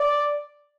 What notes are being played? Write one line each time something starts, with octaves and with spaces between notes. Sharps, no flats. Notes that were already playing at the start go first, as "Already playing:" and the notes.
Already playing: D5